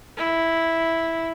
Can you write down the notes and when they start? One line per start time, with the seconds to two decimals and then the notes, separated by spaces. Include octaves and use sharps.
0.17 E4